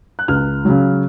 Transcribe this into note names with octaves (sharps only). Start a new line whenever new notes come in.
F#6
C#2 F6
C#3 F#3